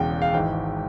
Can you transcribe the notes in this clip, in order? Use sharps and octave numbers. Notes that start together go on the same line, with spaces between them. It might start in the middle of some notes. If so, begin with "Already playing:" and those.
Already playing: E1 E2 C#3 G5
F5
G#1 G#2 E3 G5